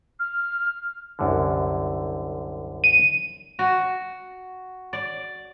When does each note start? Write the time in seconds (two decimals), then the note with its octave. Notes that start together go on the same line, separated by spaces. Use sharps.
0.20 F6
1.19 C2 F#2 D3
2.84 D#7
3.59 F#4
4.93 D5